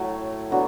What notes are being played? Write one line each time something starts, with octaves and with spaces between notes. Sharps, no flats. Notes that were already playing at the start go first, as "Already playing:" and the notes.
Already playing: A2 F#3 A3
D3 F#3 B3